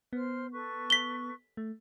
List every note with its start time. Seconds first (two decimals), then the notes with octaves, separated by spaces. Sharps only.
0.13 B3 C5 F6
0.53 A4 B4 C#6
0.90 B6 G7
1.57 A3